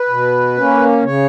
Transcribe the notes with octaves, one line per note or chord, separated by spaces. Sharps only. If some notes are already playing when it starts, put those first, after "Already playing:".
Already playing: B4
B2
A#3 C#4
C#3 C#5